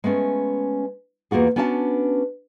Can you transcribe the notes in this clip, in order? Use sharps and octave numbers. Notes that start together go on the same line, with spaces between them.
G#3 A3 B3 C#4
E2 A#3 F4 F#4 G#4
B3 C#4 D4 F#4 E5 A5